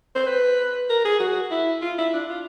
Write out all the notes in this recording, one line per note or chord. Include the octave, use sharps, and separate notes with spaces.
C5
B4
A#4
G#4
F#4
E4
F4
E4
D4
F4